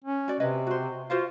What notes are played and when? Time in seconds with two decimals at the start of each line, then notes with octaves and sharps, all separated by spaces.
0.05 C#4
0.28 F#4 D5
0.40 C3 C#4 B4 D#5
0.67 F#4 C5
1.10 F4 F#4 C5 F5